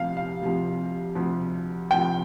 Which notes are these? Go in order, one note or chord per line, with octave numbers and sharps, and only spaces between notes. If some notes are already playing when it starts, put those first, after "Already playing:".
Already playing: D2 C3 F3 F5
F5
D2 C3 F3
D2 C3 F3
D2 C3 F3 G5